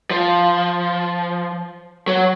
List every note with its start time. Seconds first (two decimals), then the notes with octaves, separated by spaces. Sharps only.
0.10 F3
2.07 F#3